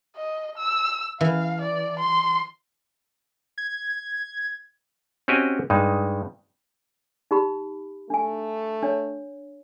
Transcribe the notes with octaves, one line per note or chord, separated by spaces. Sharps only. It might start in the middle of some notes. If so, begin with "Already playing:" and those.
D#5
E6
E3 F5
D5
C6
G#6
C4 C#4 F#4 G4 D#5 G#5
G2 G#3 D#4
D#4 G4 B5
A3 D4 G#5
D4 C#5